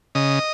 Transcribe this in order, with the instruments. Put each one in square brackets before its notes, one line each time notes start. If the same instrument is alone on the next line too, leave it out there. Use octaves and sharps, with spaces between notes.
[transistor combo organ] C#3 D#5